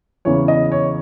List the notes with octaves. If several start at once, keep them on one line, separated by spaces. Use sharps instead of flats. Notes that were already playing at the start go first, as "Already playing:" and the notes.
E2 C#3 E3 C#5
D#5
C#5